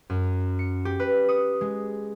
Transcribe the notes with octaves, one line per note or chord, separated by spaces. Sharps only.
F#2
C#7
G4
B4
D#6
G#3